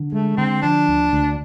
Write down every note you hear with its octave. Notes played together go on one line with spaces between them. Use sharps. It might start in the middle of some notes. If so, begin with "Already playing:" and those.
Already playing: D3
G#3 A3
D3 C4
F3 D4
D2
D2